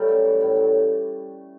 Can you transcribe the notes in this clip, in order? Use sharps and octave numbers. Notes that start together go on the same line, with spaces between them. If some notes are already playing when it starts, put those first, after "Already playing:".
Already playing: F#3 G3 A3
F#2
E3
A2
F#3